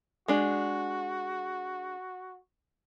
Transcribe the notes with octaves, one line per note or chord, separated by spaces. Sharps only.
G#3 D4 F#4 G#4